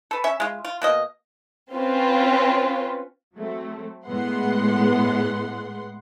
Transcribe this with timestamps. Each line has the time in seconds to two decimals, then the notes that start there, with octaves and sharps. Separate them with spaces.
0.11 A4 B4
0.24 C#4 E5
0.40 G#3 F4
0.65 F4
0.82 B2 A#3 D#5
1.73 C4 C#4 F4 B4
3.36 F#3 A3 C4
4.07 A2 G#3 B3 F#5 C6